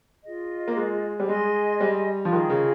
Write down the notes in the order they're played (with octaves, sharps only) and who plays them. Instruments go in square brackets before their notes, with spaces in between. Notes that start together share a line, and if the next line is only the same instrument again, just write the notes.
[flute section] F4 G#4 D#5
[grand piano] A#3
G#3
G3
[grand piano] G#3 [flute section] G#4 D#5 G#5 C6
[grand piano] G3
F3
[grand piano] D#3 [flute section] F4 G#4 D#5 G5
[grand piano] C#3